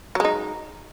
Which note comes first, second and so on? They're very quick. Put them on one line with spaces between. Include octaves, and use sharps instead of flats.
F#3 G#3 D#4